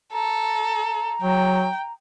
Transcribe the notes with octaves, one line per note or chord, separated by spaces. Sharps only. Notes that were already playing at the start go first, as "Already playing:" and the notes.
A4 A#5
F#3 G5